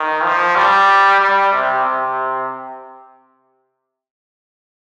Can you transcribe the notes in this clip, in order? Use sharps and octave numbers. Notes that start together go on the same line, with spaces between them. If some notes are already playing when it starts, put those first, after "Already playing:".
Already playing: D#3
F3
G3
G3
C3
C3